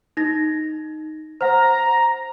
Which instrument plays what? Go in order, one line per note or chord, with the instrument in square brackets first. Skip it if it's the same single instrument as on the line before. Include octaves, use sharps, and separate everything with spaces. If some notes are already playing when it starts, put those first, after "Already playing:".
[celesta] D#4 A#6
[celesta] C5 F#5 [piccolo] A#5